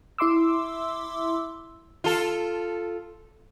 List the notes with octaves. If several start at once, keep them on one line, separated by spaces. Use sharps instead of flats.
E4 E5 C6 D6 E6
F4 A4